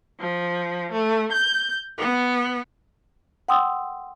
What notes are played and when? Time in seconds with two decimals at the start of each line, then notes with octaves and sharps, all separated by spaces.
0.19 F3
0.93 A3
1.32 G6
1.98 B3
3.48 F#5 G5 C6 D#6 E6